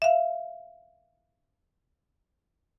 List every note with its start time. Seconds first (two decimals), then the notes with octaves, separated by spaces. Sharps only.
0.02 E5 F5